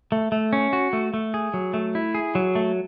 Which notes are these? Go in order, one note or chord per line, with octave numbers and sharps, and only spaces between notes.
A3
A3
C#4
F#4
A3
A3
G#4
F#3
A3
E4
G#4
F#3
A3